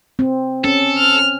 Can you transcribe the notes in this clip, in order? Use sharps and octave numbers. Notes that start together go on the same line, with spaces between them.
C4
C#4 A4
F6